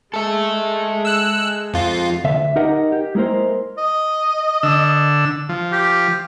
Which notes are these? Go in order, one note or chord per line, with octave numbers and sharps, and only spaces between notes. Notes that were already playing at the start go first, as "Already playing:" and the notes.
G#3 A4 E5
E6 F#6
F2 F4
D2 E5
D#4 G4 A#4 D#5 F#5
G4
G#3 A#3 E4 A#4 C5
D#5
D3 E6
F3
G4